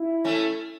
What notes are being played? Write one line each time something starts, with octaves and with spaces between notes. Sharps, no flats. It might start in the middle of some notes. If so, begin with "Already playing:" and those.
Already playing: E4
A3 C#4